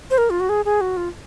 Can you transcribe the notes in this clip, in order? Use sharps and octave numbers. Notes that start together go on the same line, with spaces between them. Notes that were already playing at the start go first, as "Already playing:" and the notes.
C5
A#4
F4
F#4
G#4
G#4
F#4
F4